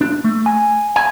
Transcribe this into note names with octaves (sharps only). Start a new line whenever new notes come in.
D4
A3
G#5
G#5